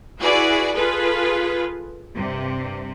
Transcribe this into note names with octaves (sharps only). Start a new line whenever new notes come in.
E4 F#4 G#4 B4 D5
F4 G#4 A4 B4
G2 C3